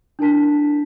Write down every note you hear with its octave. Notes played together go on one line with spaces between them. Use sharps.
D4 E4 A#4 A5 B6